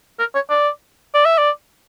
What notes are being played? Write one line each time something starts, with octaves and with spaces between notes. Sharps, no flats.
A#4
C#5
D5
D5
E5
D5